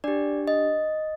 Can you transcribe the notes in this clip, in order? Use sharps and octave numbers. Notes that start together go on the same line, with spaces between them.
D4 G4 D5
D#5